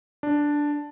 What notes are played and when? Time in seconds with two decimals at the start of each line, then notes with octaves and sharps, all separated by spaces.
0.23 D4